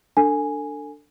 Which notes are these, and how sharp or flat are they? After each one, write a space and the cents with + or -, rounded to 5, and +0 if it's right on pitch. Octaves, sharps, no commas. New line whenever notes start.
D4 +5 A4 +25 G#5 +0